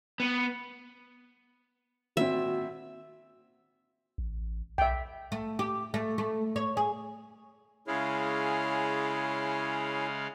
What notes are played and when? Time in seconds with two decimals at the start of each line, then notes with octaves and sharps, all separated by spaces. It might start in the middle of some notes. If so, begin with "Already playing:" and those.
0.20 B3
2.17 G#1 A#2 C4 F#4 E5
4.18 A1
4.78 B1 E5 G5
5.32 A3
5.59 G4
5.94 A3
6.18 A3
6.56 C#5
6.77 G#4
7.87 C#3 G#3 E4 G#4 C#5 F5